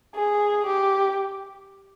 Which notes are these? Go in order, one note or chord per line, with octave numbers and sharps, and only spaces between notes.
G#4
G4